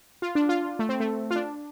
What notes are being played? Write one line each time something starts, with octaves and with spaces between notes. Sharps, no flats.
F4
D4
F4
A3
C4
A3
F4
D4